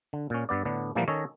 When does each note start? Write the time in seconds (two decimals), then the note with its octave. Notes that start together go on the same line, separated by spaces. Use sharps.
0.13 D3
0.30 A#2 C#4
0.49 G2 B3 D5
0.65 A2 D3 B3 D4
0.95 A#2 E3 F3 G3 A#3 B3
1.08 D#3 C#4 A4 C#5 D#5